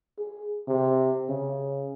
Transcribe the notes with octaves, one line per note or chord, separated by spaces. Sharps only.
G#4
C3
C#3